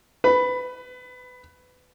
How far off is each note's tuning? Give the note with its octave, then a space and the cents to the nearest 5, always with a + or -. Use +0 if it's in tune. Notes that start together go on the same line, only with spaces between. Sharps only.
B4 +25 B5 +0